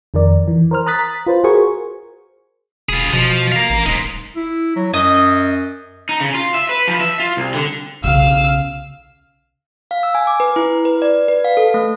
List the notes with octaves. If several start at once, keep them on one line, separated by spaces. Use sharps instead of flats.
F2 D#3 A#4 D5
E3
A#4 C5 F6
A#5 D#6 F#6 A6 B6
F4 B4 C5
F#4 G#4 A#4 C5 G#5 C#6
E1 F4 G#4
B2 F3
A#4 F5
A1
D#1 D#4 C5
E4
F#3
F#2 D#5
D#4
C#3
F4
E5
B4
F3
E5
F4
C2
D3
B1 C#3 F5 E6
F5
E6
G#5
D6
B4
E4
B4
D5
B4
F5
A4
A3